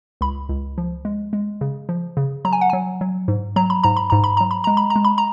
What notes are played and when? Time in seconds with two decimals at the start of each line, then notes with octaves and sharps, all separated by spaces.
0.21 C#2 B5
0.49 C#2
0.78 F3
1.05 G#3
1.33 G#3
1.61 C#3
1.89 F3
2.17 C#3
2.45 F#3 A#5
2.53 G#5
2.61 F#5
2.70 F#3 G#5
3.01 F#3
3.28 G#2
3.56 F#3 A#5
3.70 B5
3.83 G#2 A#5
3.97 B5
4.10 G#2 A#5
4.24 B5
4.37 F#3 A#5
4.51 B5
4.64 G#3 A#5
4.77 B5
4.90 A#5
4.96 G#3
5.05 B5
5.18 A#5